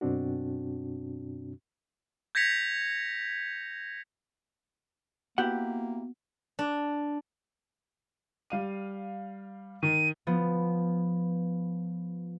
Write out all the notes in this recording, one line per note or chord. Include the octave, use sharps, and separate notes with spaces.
F#2 B2 C4 D4 F#4
G6 G#6 A#6 B6 C#7 F7
A#3 B3 E4 F#4 G4 F#5
D4
G3 F5 D#7
D#3 D#7
F3 B3